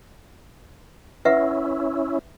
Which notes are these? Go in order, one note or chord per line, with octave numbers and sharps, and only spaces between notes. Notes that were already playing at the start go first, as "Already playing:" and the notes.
C#4 E4 B4 E5 F#5